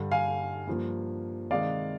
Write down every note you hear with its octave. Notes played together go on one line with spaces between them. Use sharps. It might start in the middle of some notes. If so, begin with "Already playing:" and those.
Already playing: G2 D3 G3
F5 G#5
G2 F3 A#3
C3 D#3 G#3 D5 F5